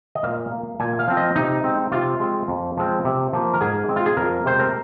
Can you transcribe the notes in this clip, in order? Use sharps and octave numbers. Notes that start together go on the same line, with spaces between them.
D#5
A#2 F5
A#3
A#2 G#5
F5
F3 C4
D#5
C3 D#4
G#3 C4
C3 F4
G#3 C4
F2
F3 G#3 C4
C3
F3 A#3
A#4
G#2 G#4
G#3 C4
F4
G#4
F2 A#4
C3 G#3 C4 C5
A#4